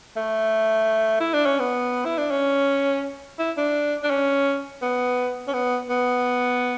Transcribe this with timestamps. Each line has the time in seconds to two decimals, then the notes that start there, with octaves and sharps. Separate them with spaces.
0.16 A3
1.20 E4
1.34 D4
1.46 C#4
1.59 B3
2.05 E4
2.18 D4
2.31 C#4
3.39 E4
3.57 D4
4.03 D4
4.10 C#4
4.82 B3
5.48 C#4
5.53 B3
5.89 B3